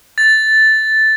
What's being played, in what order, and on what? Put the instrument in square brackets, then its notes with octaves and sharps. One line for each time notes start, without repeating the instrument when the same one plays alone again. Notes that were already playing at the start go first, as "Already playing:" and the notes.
[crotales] A6